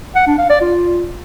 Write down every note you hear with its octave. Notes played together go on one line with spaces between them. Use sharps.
F#5
D4
F5
D5
F4